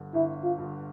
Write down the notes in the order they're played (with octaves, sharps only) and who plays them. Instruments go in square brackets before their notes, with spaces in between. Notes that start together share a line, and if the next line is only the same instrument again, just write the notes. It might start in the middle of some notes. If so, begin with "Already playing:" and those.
Already playing: [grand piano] G1 G2 D3
[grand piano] G1 [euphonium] E4
[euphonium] F4
[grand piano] G2 D3